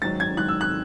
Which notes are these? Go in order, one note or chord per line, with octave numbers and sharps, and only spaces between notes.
G#2 D#3 F#3 A6
G#6
G#2 D#3 F#3 F#6
E6
F#6